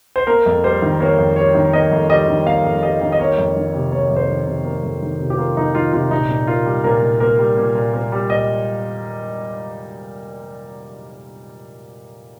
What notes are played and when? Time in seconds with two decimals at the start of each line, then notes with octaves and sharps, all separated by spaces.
0.16 C5
0.27 A#3 A#4
0.46 F2
0.63 G3 C5
0.82 D#3
1.00 A#3 C#5
1.18 F2
1.36 G3 C#5
1.55 D#3
1.73 A#3 D#5
1.91 F2
2.10 G3 D#5
2.28 D#3
2.46 A#3 F5
2.64 F2
2.83 G3 D#5
3.01 D#3
3.12 D#5
3.19 A#3 C#5
3.38 F2
3.56 D#3
3.74 C3
3.92 A#3 C#5
4.10 F2
4.16 C5
4.29 D#3
4.47 C3
4.65 A#3
4.83 F2
5.02 D#3
5.20 C3
5.30 G4
5.38 A#3 F4
5.57 F2 D#4
5.74 D#3 F4
5.93 C3 F4
6.11 A#2 D#4
6.29 A#2
6.47 A#3 F4
6.66 G3
6.84 A#2 A#4
7.02 A#2
7.20 A#3 A#4
7.39 G3
7.57 A#2
7.75 A#2
7.94 A#3
8.12 G3
8.30 A#2 D#5